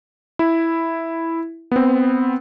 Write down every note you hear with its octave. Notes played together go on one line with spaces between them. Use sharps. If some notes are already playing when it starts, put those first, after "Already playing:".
E4
B3 C4